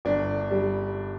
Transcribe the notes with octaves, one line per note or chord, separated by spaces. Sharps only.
G1 D4
G3